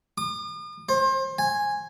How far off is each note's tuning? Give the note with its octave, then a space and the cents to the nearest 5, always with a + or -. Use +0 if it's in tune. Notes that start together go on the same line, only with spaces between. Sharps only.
D#6 -45
C5 +30
G#5 -5